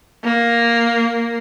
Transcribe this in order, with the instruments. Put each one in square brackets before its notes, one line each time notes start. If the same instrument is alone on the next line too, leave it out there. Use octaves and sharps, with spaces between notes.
[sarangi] A#3